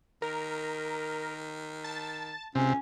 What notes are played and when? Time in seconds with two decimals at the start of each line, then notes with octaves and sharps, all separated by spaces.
0.22 D#3 A#4
1.84 A5
2.55 C#2 C3 C#4